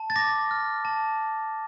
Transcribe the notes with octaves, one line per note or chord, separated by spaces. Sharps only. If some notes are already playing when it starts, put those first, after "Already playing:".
Already playing: A5
A6
D6 A#6
F6
A5